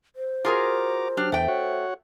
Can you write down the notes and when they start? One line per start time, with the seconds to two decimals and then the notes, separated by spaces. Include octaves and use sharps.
0.16 C5
0.45 F4 F#4 G#4 A#4 A#5 D6
1.17 F#3 D4 G4 F6
1.32 E2 A3 G5
1.48 F#4 C#5 F#5